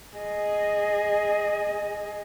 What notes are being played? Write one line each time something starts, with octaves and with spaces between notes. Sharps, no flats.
G#4 D#5